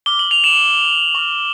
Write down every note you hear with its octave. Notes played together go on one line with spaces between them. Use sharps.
D6 F6 G7
F#7
F7
E7 F#7
C#6 F6